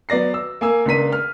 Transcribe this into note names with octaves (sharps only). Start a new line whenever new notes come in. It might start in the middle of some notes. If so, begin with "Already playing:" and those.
F#3 B3 D5 A#6 C7
E6
A#3 G#5 E6
C#2 A#3 D4 B6 D#7
F6